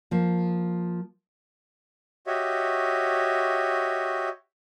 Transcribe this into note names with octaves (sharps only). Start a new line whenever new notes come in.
F3 A#3
F#4 G4 C#5 D#5 E5